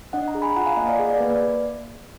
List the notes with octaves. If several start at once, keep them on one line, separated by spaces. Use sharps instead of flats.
D4 D#5 F#5
F#5 A#5
G#4
G#5 B5
F4 F#5 A#5
F5 G#5
A#3 D#5 F#5
D5 F5
G#4
D5
A#3 B4
D5